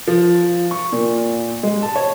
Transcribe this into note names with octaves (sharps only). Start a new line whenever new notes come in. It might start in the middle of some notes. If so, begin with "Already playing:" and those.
F3
C#6
A#2
G#3
A5
C#5